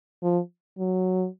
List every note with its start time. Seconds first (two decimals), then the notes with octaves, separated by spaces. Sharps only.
0.23 F3
0.78 F#3